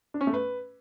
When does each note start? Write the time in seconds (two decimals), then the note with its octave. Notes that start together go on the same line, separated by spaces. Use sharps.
0.14 D4
0.21 C#4
0.27 A3
0.33 B4